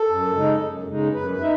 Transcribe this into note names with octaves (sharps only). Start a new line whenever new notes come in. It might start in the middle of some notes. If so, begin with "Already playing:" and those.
Already playing: A4
F#2
C#3 G#3 D#4
F#2
C#3 G#3 D#4
F#2 B4
B4
D#4 E5